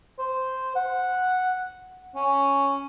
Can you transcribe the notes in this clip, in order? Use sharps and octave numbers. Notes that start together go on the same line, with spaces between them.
C5
F#5
C#4